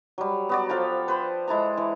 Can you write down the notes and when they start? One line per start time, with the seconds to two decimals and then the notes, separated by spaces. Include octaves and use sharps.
0.18 F#3 G3
0.49 B3 F#4 D5
0.69 F3 A4 F5 G5
1.08 B4 C5
1.48 G#3 E4 A4 A#5
1.77 E3